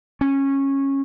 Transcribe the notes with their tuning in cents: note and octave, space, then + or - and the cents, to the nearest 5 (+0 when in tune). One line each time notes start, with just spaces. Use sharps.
C#4 -15